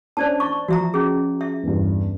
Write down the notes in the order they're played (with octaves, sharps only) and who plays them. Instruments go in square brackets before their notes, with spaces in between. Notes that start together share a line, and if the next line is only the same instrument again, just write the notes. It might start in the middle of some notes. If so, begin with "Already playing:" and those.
[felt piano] C#4 D4 [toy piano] C5 D5 A5
[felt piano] A5 [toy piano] C#6
[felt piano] F3 [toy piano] F#4 E5 A#5
[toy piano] C#4 G#4
E5
[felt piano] E2 G2